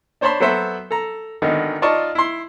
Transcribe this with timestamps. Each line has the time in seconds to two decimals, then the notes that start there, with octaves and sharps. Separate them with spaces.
0.21 D4 C5 C#5 A5 B5 C6
0.40 F#3 B3 A4 B4 C5 E5
0.91 A4 A#5
1.42 G#1 D3 D#3 B3 D#4
1.82 D#4 F4 D5 D#5 A5 C#6
2.15 E4 C6